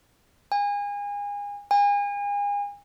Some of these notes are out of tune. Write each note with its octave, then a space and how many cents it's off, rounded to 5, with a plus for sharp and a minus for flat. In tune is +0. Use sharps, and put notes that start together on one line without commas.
G#5 -30
G#5 -35